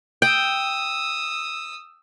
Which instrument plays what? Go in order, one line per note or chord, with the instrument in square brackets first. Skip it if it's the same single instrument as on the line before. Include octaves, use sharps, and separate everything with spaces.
[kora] G5 [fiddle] D#6 E6